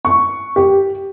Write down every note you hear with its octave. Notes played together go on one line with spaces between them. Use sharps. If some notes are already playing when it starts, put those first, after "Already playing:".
C#6
G4